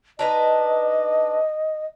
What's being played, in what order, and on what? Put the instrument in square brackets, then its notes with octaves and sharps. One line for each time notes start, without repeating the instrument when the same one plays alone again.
[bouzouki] D4 D#4 B4 [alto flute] D#5